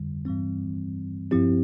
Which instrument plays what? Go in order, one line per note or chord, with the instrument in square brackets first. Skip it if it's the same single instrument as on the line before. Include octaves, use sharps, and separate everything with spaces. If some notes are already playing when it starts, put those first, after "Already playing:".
Already playing: [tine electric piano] F2 D3 G3
G2 E3 G3 C4
G2 F3 C4 E4 G4